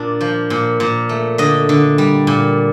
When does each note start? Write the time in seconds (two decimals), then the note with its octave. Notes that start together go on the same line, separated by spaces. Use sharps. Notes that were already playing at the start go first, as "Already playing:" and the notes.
Already playing: A#2 D4
0.21 F3
0.50 A#2
0.80 A#2
1.09 A3
1.38 D3 D#5
1.69 D3
1.98 G3
2.27 A#2